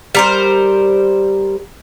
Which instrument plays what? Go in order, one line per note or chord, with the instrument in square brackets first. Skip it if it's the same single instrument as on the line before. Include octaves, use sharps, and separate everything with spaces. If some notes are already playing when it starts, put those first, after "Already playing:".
[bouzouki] G3 A#4 C5